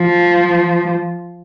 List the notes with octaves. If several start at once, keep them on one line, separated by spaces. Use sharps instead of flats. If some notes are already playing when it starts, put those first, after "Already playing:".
Already playing: F3